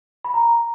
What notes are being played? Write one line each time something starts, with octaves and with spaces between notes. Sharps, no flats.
B5
A#5